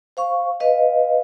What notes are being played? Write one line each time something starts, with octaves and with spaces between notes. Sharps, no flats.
C5 F5 C#6
B4 D#5 F5